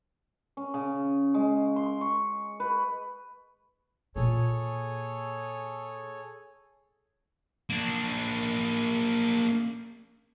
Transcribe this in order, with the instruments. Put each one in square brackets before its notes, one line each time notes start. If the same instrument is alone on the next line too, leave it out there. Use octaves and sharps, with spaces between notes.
[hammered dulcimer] C#4
C#3
G#3
C6
C#6
B4
[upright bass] A#2 A#3 [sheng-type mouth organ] G#4 A4 C#5
[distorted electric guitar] A#3 D4